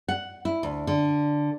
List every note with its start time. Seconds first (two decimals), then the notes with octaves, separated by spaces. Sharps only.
0.08 F#5
0.45 E4
0.63 D2
0.87 D3